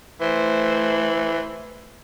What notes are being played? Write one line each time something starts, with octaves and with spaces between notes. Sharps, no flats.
E3 A3 C5